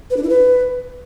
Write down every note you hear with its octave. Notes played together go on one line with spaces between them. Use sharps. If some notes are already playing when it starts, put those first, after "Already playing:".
B4
D4
E4
B4